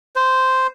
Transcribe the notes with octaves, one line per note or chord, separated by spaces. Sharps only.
C5